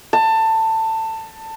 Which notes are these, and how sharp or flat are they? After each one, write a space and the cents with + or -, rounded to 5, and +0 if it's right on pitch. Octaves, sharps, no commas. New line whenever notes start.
A5 +20